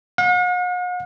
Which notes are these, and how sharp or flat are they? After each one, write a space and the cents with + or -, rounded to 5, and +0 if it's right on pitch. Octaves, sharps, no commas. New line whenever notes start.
F#5 -45